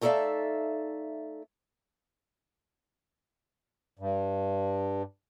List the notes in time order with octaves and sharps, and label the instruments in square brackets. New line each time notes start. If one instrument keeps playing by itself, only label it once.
[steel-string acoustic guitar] A3 D#4 A4 D5 E5 F5
[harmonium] G2